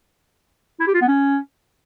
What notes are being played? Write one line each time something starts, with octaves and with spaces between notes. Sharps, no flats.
E4
G4
F4
B3
C#4